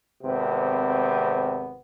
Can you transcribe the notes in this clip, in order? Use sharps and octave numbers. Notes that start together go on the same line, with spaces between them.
G#1 C3 B3